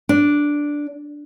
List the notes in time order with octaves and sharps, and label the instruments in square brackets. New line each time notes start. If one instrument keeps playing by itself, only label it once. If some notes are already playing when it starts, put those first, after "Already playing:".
[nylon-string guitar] D4